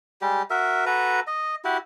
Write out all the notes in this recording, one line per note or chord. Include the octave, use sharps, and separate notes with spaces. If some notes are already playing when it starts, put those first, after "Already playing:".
G3 G#3 G4
F#4 A#4 E5
F#4 A4 B4 A#5
D#5
E4 F#4 G4